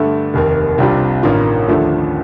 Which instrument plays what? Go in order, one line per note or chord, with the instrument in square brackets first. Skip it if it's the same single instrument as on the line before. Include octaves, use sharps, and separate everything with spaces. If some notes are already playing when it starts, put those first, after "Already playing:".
Already playing: [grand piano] G2 D3 A3
F1 D#2 D#3 A#3
C2 C3 G3 D4 F4
A1 G2 D#3 A#3 F4
D#2 D3 F3 A3